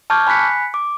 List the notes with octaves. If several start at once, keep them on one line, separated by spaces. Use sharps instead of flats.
A5 C#6 D6 F6 G6 G#6
G#5 B5 F#6 B6 C#7
D6